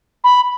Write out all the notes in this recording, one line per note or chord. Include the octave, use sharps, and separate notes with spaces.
B5